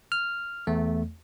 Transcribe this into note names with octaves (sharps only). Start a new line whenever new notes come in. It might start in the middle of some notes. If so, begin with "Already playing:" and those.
F6
E2 A3